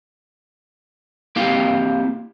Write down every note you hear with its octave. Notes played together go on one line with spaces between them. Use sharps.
A#3 C4 E4 G4 F5 G5